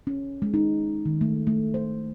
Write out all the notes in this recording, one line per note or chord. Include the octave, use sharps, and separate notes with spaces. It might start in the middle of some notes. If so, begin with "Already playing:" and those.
C#4
G#3
D#4
D#3
A3
A3
C5